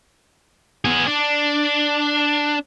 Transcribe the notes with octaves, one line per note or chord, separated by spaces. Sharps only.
B3 G#4
D4